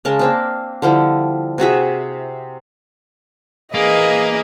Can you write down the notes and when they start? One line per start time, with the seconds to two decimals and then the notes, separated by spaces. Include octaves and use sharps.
0.05 C#3 G#3 A#4 A5
0.19 A#3 C4 D4
0.82 D3 F3 G3 E4
1.58 C3 F#4 G#4 E5
3.74 E3 A#3 G#4 B4 D#5